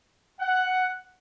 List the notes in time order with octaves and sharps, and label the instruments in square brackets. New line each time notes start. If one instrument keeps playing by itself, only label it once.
[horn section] F#5